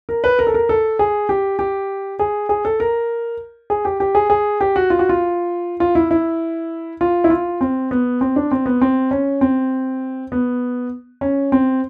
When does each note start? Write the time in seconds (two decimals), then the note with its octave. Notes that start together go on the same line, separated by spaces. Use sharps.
0.09 A#4
0.24 B4
0.39 A#4
0.47 A4
0.54 A#4
0.69 A4
0.99 G#4
1.29 G4
1.59 G4
2.19 G#4
2.49 G#4
2.65 A4
2.80 A#4
3.70 G#4
3.85 G4
4.00 G4
4.15 G#4
4.30 G#4
4.61 G4
4.76 F#4
4.90 F4
4.99 F#4
5.09 F4
5.80 F4
5.95 E4
6.11 E4
7.01 F4
7.24 E4
7.30 F4
7.61 C4
7.91 B3
8.21 C4
8.36 D4
8.51 C4
8.66 B3
8.81 C4
9.11 C#4
9.41 C4
10.32 B3
11.21 C#4
11.52 C4